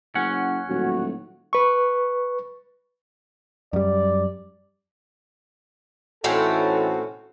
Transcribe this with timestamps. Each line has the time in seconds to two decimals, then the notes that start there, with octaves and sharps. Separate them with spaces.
0.15 F#1 C#4 F#5
0.69 D#1 A2 F#3 F#4
1.53 B4 C#6
3.73 F#2 G3 D5
6.24 A2 E3 C4 C#4 D#4 F#4 A4